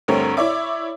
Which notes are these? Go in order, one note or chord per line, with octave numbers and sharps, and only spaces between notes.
D2 G2 A3 C4 A#4 C#5
E4 C#5 D5 E5 D6